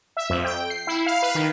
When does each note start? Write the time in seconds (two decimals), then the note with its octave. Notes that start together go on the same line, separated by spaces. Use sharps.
0.17 E5
0.30 F2
0.45 G5
0.70 C7
0.87 E4
1.06 F5
1.22 B4
1.35 D#3